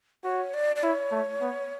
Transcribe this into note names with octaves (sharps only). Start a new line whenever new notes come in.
F#4 C#5
D5
D5
E4 C#5
A3
B3